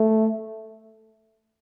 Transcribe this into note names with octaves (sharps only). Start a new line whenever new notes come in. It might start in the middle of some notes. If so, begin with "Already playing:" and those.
Already playing: A3